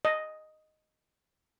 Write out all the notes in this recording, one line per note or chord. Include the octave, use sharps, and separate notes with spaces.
D#5